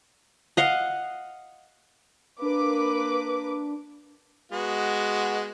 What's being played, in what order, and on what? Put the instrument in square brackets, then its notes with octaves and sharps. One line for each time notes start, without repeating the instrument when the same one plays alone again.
[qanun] D#5 F5 F#5
[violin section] A#3 B4 D6 [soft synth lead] D4
[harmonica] G#3 B3 F#4